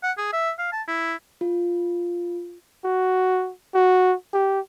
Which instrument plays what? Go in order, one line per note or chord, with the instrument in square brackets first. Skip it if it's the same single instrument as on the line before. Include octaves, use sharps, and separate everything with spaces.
[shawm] F#5
G#4
E5
F5
A5
E4
[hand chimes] F4
[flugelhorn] F#4
F#4
G4